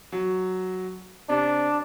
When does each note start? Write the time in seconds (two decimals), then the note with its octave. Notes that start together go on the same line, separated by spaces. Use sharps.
0.12 F#3
1.29 C3 D4